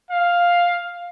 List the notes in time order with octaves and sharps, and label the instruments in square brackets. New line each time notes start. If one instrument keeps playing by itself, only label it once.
[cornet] F5